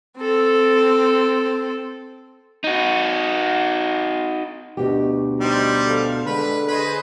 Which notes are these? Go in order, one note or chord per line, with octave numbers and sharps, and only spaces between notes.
C4 A4
D#4 F#4
D2 B2 G4
G3 D#4 C5
A4 C5 F5
D3 G#3 B4
G#4 B4 C5 D#5